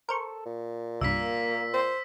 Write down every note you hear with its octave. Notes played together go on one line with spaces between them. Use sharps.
A4 A#4 C5 C#6
A#2
C2 G2 A#3 E6 B6
C5